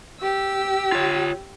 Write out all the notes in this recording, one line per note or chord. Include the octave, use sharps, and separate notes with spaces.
G4 E6
F4 C#5